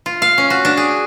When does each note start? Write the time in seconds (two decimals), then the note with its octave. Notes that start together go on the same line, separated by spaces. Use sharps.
0.06 F4
0.22 F5
0.38 C#4
0.50 F#4
0.65 D4
0.77 G#4